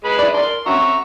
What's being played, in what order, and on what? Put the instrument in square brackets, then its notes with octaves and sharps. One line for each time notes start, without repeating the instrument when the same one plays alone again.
[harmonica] G#3 B4 B5
[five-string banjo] E4 D5
[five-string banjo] A#4 D5 [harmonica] C6
[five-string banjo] C4 C#4 F#4 [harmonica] E5 A#5 C#6